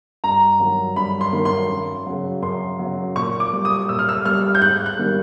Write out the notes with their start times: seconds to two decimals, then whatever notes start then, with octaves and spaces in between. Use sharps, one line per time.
0.24 G2 A#5
0.60 D#3 F#3
0.96 G2 B5
1.21 C6
1.33 D#3 F#3
1.45 C6
1.69 F#2
2.06 C#3 F#3
2.42 F#2 C6
2.79 C#3 F#3
3.16 A#2 C#6
3.40 D6
3.53 G3
3.65 D#6
3.89 A#2 E6
3.99 F6
4.09 E6
4.26 G3 F6
4.55 G6
4.61 G#2 F#6
4.86 F#6
4.99 D#3 G3